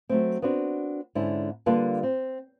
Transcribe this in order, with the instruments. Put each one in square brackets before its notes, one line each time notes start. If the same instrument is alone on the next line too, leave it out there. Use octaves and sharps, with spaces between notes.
[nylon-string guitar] F#3 A3 C4
B3 C4 D4 F#4
G#2 D3 C#4 E4
D3 G3 A#3 F4 A4 B4
C4